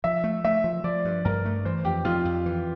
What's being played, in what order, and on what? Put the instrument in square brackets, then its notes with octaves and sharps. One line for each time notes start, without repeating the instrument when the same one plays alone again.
[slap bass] F3 [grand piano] E5
[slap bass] A3
[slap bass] A3 [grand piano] E5
[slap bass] F3
[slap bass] F3 [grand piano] D5
[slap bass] G2
[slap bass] G2 [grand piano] A#4
[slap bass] A3
[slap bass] E3 [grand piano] C5
[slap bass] F2 [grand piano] G4
[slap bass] F2 [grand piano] F4
[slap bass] F2
E3